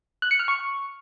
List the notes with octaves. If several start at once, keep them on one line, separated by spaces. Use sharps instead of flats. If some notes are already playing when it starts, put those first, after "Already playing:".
F#6
C#7
F6
C#6